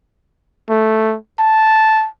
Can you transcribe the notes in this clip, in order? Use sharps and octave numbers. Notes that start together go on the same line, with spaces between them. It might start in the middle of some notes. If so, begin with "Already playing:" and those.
A3
A5